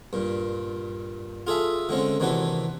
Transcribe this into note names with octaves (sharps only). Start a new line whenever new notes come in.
G2 A#2
F4 G#4 A4 E5
D3 G#3 C4 C#4
D#2 C3 E3 D4 F#4 B4